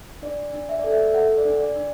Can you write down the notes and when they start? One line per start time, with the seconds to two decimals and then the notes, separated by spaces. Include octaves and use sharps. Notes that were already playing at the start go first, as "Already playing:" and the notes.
0.22 D4 D5
0.53 D4
0.69 E5
0.79 A4 D5
0.91 E5
1.14 A4 F#5
1.38 D5
1.45 D4
1.60 D5
1.76 D4